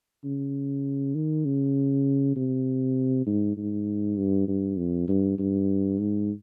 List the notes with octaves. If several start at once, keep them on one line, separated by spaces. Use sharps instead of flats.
C#3
D#3
C#3
C3
G#2
G#2
G2
G2
F2
G2
G2
G#2